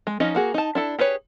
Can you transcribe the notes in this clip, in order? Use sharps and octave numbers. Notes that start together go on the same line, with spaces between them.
G#3
F3 C#4 D#4 D#5
A#3 F#4 G#4
D#4 A5
D4 E4 A4
G4 G#4 B4 C#5